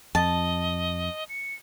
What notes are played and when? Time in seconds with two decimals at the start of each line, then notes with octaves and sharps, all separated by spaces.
0.15 F2 D#5 A5
1.29 C#7